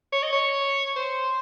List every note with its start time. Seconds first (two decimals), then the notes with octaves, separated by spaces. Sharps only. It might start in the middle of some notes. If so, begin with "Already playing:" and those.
0.12 C#5
0.23 D#5
0.33 C#5
0.96 C5